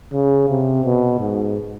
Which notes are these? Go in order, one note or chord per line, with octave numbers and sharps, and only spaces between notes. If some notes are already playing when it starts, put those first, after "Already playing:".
C#3
C3
B2
G#2